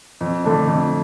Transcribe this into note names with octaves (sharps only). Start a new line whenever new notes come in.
F2
D3 A3 D4
F2